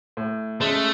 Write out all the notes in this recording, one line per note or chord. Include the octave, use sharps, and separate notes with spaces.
A2
G#3 A3 C#4